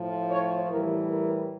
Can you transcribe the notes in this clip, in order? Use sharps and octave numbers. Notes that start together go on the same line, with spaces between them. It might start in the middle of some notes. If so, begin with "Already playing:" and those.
Already playing: A2 F3
C#5
A2 E3 G3 A#4
A#4